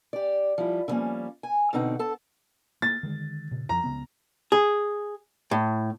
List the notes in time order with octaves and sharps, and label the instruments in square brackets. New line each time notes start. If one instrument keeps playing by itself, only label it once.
[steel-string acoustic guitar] G4 D5
F3 G3 E4
D3 F3 G3 A#3 C#4
G#5
B2 D3 C4 D#4 F#5
A4 A5
[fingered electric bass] A#3 [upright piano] A6
[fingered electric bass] D3 D#3 G#3
A#2 C#3
[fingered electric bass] F2 F3 [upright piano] A#5
[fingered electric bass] C#2 C#3 B3
[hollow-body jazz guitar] G#4
A2